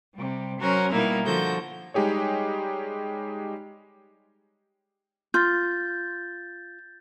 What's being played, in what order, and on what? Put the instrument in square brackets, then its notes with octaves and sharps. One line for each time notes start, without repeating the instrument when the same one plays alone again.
[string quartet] C3 G3
F#3 C#4 F#4 A#4 C5
B2 G3 A#3 D#4 E4 A#4
D3 F3 F#4 A4 G6 A#6
[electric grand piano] G3 G#3 D#4 G4 G#4 C#5
[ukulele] F4 [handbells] G6 A6